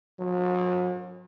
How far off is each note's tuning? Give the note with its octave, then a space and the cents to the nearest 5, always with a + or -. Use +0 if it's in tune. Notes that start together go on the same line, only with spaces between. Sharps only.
F#3 -45